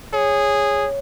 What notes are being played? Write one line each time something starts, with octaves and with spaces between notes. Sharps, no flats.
G#4 C#5